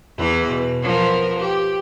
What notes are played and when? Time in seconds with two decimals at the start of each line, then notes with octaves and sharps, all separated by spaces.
0.18 E2 E3 B4
0.49 B2
0.82 F3 B3 A#4
1.39 G4